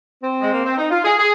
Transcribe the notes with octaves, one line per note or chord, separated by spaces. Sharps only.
C4
G#3
A#3
C4
D#4
F4
G#4
G#4